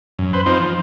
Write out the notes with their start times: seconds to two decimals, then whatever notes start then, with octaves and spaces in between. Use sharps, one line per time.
0.19 F#2
0.33 B4 C5
0.46 C4 D#4 F4 C5
0.60 F3